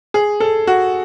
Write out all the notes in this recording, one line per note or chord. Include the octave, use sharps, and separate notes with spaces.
G#4
A4
F#4